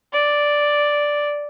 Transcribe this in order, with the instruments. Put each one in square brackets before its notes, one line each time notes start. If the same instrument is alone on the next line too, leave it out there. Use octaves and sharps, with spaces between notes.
[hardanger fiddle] D5